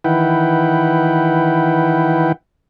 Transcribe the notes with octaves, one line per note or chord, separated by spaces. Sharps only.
D#3 E3 E4 B4 F#5 G5